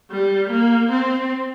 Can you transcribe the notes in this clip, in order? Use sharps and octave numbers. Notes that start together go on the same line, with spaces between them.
G3
A#3
C4